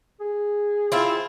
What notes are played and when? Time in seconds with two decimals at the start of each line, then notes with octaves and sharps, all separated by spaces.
0.21 G#4
0.92 C4 E4 F4